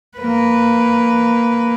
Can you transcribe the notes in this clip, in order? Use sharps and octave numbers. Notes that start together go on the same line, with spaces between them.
A#3 B4